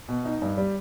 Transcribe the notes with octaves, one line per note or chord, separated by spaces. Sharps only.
B2
D#4
G2
G3